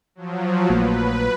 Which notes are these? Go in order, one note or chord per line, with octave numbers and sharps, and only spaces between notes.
F3 F#3
A#1 A3 A#3 B4